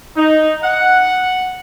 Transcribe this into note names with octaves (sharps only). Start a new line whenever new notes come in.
D#4
F#5